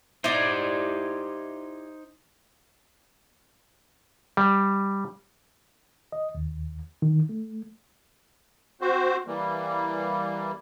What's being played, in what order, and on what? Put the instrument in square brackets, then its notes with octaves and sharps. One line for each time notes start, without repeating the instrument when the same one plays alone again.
[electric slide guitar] D#4 C5 [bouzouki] E4 G4 D5
[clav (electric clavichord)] G3
[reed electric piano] D#5
D#2
D#3
A3
[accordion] C4 F#4 C5
E3 G3 A#3